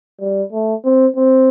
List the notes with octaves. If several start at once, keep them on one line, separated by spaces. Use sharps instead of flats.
G3
A3
C4
C4